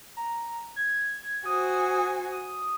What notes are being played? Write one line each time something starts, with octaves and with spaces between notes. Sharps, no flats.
A#5
G#6
F#4 C5 G#5 D#6
D#6